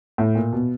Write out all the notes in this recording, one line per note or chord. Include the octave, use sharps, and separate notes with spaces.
A2
A#2
B2